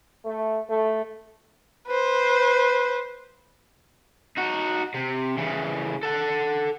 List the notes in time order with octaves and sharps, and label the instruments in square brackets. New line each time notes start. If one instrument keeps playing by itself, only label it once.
[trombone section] A3
A3
[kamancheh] B4 C5
[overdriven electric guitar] D#4 F#4
C3
C#3 E3
A4 F#5